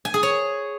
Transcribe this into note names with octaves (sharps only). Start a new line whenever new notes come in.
G#5
G#4
C#5